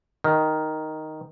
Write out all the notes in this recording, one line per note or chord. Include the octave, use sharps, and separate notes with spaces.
D#3